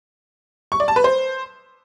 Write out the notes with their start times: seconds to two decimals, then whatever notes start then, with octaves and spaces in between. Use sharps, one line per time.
0.72 C#6
0.80 D5
0.88 A5
0.96 B4
1.04 C5